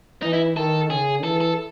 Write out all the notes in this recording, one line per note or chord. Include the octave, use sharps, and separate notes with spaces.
E3 D#4
E4
D#3 A4
C#3 G#4
E3 A4
A4